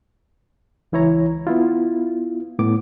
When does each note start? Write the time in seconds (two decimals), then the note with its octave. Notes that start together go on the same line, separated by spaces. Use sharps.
0.92 C#2 E3 E4 C#5 A#5
1.47 B3 E4 F4
2.59 A2 B3 D6